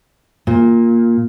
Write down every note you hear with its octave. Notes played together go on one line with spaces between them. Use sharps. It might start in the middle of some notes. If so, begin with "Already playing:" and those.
A#2